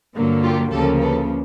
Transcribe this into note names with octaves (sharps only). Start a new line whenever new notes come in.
G2 D3 F#3 A#3
F4 G4
D2 C#3 F3 A#3 G4 A4
A4 B4